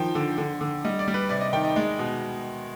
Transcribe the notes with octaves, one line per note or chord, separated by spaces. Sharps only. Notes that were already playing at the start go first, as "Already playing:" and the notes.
Already playing: D#3 F3 G5
D3
D3
D3
G3 D#5
D5
G3
B4
C3 D5
D#5
D#3 G5
D#5
G#3
B2